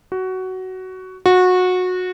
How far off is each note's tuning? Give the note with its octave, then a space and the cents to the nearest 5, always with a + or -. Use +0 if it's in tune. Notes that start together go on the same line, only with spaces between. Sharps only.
F#4 +15
F#4 -20